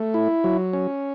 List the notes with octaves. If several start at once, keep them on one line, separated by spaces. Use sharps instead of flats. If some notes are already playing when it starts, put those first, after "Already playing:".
Already playing: A3
E4
F#3
C#4